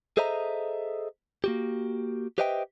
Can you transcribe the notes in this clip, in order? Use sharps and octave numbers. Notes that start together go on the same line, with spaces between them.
G#4 A4 C5 D#5 E5 A#5
A#3 F#4 G4
G4 B4 C5 D#5 E5 G5